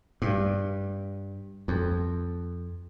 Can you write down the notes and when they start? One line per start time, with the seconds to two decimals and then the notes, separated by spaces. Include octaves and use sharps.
0.22 G2
1.68 F2